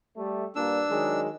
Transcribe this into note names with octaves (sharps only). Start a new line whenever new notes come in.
G3 A3
G2 A#2 D4 E6
D#3 F#3 G#3